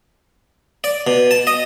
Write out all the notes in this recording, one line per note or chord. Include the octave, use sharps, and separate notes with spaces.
D5
B2
A5
D#5